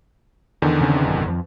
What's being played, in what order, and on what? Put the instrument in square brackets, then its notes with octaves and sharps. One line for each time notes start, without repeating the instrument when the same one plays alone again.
[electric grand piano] E2 D3 D#3
[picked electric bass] C#3 C4 D4
G#1 F#2 C3
F2 E3 F3